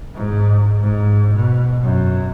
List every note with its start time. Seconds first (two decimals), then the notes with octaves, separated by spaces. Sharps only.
0.14 G#2
0.82 G#2
1.35 B2
1.83 F#2